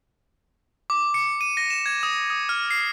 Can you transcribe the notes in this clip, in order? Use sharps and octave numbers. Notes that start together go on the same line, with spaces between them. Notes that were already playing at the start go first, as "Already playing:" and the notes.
D6
C#7
D#7
A#6
E7
G#6
D#6
D#6
F6
C7